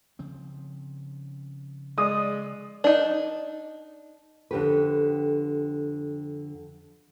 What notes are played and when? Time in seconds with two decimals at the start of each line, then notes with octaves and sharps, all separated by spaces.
0.19 C#3 F3 C4
1.98 G#3 D5 D#6
2.84 D4 D#4
4.51 F2 D3 G4 B4